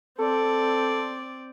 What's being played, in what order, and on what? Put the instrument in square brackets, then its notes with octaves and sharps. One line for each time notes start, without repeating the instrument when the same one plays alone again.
[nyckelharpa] C4 D5 [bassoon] A4